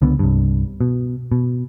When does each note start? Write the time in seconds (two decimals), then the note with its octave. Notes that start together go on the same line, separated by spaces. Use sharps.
0.02 C#2 D3 B3
0.19 C2 G2
0.81 B2
1.32 B2